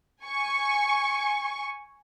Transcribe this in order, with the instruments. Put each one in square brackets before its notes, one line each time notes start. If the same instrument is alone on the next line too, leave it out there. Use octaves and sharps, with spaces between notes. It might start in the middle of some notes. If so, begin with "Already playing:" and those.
[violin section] G#5 C#6